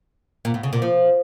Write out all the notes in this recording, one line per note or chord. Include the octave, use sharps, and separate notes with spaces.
A#2
A2
C#3
A#2
F3